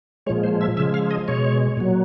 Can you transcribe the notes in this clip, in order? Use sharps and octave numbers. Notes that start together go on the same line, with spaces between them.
A#2 F3 G#3 C#5
C5
E5
C#3 F3 G#3 E5
F5
D#5
B2 G#3 C#5
A#2 F#3